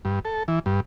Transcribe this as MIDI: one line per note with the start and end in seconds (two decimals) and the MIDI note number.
0.05 0.20 43
0.25 0.43 69
0.48 0.59 52
0.66 0.80 43